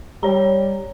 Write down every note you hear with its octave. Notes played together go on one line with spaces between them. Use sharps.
G3 C#5 A#5